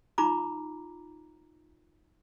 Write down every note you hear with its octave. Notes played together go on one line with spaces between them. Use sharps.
D#4 F4 A#5 B5 D6